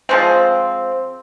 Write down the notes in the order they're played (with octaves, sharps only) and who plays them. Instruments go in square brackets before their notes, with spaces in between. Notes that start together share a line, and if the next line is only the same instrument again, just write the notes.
[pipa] F3 G#3 C4